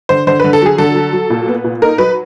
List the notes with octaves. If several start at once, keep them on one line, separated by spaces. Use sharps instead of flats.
D3 C5
D3 C5
B4
D3
A4
F#3 G#4
D3 A4
F#3
F#3
A#2
B3
A#2
D#4 A#4
F#3 B4